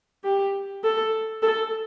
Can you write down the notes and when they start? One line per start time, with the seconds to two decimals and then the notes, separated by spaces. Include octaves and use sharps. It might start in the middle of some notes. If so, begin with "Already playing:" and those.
0.24 G4
0.84 A4
1.42 A4